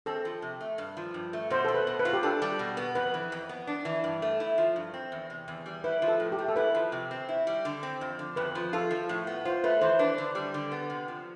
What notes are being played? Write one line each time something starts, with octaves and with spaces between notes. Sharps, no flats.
C4 A4
F3
C3
A3
G2
F3
G2
A3
B2 C5
B3 A4
B4
B2
B4
F4
G4
D4 A4
G3
B2
B3
F2 B4
E3
F2
B3
D4
E3
G2
A3
E4
F3
G2
C4
E2
C3
E2
G3
E4 B4
F3
A4
A2
G4
A3
A4
E4 B4
F3
C3
C4
E4
G3
D3
C4
F2
D3
F2 B4
F3
F4 A4
F3
A2
B3
F4 C5
A3 B4
E3 C5
D4 B4
D3
G3
D3
B3
C3
F3